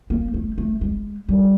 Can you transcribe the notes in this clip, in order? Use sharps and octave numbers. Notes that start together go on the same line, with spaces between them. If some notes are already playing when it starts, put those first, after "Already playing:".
A#3
A3
A3
G#3
G3